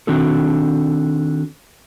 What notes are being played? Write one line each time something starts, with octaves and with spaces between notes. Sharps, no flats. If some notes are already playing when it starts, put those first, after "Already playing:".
D#3 C4 D4 F#4 A4